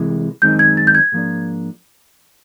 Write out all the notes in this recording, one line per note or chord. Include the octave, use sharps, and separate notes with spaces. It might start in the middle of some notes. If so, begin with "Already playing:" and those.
Already playing: C2 C3 E3 G#3
F#2 D#3 G#3 C4 D#4 G6
G#6
A6
G6
G#6
G#2 F3 A#3 D4